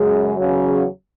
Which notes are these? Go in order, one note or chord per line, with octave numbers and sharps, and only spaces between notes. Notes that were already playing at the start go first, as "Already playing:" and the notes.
Already playing: F#2 C#3 G#3
E2 C#3 F#3